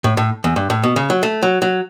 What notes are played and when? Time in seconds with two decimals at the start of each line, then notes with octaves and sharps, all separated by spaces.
0.04 A2
0.17 A2
0.44 E2
0.56 G2
0.70 A2
0.83 B2
0.96 C#3
1.10 F#3
1.23 A3
1.43 F#3
1.62 F#3